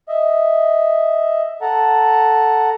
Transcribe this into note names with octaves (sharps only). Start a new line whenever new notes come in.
D#5 E5
A4 F#5 A#5